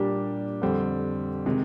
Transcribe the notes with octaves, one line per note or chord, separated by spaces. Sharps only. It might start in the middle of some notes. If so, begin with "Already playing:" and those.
Already playing: A#2 G3 A#3 D4 G4
F2 D3 G3 C4
C3 D#3 G#3